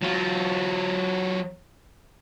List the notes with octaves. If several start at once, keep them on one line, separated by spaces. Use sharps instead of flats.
F#3 F4